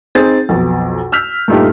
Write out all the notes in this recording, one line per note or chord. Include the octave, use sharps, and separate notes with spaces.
C4 D#4 G#4 A6
B1 F2 B2
E6 F6 G6 B6 F7
G2 A#2 A3 D#4 F4 G4